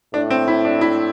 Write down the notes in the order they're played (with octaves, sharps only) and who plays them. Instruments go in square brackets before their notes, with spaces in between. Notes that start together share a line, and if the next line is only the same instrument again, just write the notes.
[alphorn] A2 [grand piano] D4
[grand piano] C4
E4
D4
E4